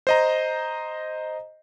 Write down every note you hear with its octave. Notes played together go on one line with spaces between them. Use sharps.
C5 D#5 A#5